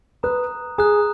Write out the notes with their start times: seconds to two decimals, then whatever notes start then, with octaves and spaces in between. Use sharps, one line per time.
0.23 B4 A#5 D#6 F#6
0.78 G#4 A#5 D#6 F#6